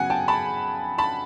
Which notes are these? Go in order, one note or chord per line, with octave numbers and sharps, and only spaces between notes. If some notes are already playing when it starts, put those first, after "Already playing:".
Already playing: C#3 F#3 B3 F#5 G#5
G5 A5
A5 B5
A5 B5